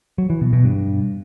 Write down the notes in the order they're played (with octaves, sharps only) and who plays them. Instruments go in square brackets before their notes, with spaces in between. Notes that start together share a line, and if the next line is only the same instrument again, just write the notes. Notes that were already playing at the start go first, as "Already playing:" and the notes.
[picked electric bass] F#3
E3
B2
B2
G2